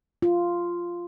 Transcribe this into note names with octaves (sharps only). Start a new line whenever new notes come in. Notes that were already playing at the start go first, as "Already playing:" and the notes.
F4